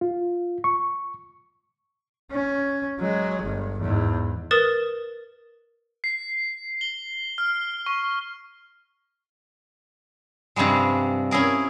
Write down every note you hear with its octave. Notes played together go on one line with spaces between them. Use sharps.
F4
C#6
C#4
F#3 G#3
G1 G2
E2 G#2
A#4 B4 D#6 A6 E7
C7
G7
F6
C#6
G2 C3 F3 G3 G#3
C#4 E4 G#4 A#4